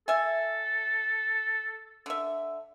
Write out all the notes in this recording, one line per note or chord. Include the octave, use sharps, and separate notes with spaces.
A4 E5 G#5
D3 E5